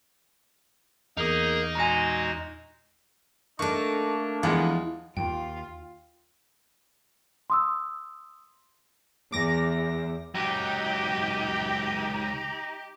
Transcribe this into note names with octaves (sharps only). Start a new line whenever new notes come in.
E2 A#3 D#4 G#4 A#4 D#6
A#2 G#3 F#4 G#5 A#5
A3 A#3 D4 D#4 A4 C#6
E2 E3 F3 G#3
D#2 F4 G5
C6 D#6 E6
E2 D6 A#6
C#2 F#3 D#4 G4 G5